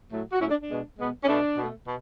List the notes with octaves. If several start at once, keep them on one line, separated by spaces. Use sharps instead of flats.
A2 F#3 A3
F#4
A2 F#3 A3 C#4 E4
D4
D4
B2 G#3 B3
B2 G#3 B3
C#4
B2 A3 D4
B2 A3
B2